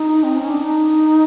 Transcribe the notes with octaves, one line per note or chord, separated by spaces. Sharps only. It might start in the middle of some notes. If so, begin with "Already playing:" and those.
Already playing: D#4
C4
C#4
D4
D#4